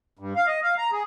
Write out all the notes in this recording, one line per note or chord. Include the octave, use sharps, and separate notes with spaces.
G2
F5
D#5
F5
A#5
G#4